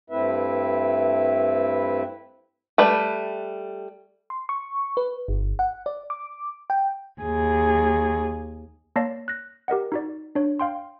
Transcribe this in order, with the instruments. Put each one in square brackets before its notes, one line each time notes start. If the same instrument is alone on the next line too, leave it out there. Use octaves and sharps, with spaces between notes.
[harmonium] G2 A3 C4 E4 B4 E5
[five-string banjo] G3 A3 B4
[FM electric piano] C6
C#6
B4
G1
F#5
D5
D6
G5
[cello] D#2 G#4
[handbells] A#3 C#5 D5 A5 A#6 C7
F#6 A#6
G4 A#4 D#5 F#5
D#4 F#4 D5
D4 C#5
F5 G5 C6